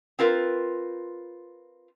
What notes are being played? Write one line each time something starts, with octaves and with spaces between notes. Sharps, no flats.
C4 F4 A#4 B4